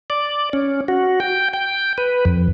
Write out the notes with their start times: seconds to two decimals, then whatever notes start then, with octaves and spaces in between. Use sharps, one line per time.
0.10 D5
0.53 C#4
0.88 F#4
1.20 G5
1.53 G5
1.98 B4
2.25 F2